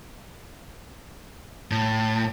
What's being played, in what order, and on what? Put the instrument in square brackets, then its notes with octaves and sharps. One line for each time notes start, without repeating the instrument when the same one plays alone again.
[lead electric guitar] A2